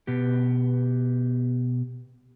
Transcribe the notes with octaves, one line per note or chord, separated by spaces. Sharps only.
B2 B3 G4